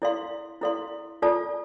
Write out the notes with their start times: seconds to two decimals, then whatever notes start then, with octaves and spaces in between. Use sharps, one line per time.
0.02 E4 A4 D5 F5 C6
0.62 E4 A4 D5 F5 C6
1.22 F4 A4 D5 A5